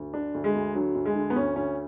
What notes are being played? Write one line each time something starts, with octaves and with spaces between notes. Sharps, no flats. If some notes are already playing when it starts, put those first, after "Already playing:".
Already playing: D2
D3 D4
D2
G#3
D2
D3 F#3
D2
G#3
D3
B3
D2 C#4
D2 C#4